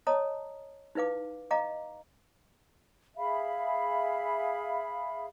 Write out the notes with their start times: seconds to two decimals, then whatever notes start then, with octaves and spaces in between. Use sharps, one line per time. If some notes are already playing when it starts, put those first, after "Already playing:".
0.07 C#5 D#5 A5 A#5 D#6
0.95 D#4 E4 B4 F5 D6
1.51 D#5 F5 A#5 D6
3.16 G#4 E5 F5 B5